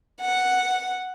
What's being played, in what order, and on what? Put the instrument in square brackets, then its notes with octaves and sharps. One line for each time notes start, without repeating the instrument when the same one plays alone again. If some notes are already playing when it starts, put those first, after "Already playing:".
[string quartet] F#5